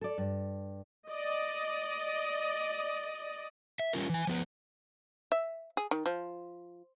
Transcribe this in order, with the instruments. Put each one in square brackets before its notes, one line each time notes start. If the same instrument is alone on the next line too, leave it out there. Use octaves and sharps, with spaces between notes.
[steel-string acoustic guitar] A4 D5
G2
[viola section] D5 D#5
[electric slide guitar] E5
G3 C#4 F4 A#4
E3 G#5
F3 B3 B4
[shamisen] E5
G#4
D#3
F3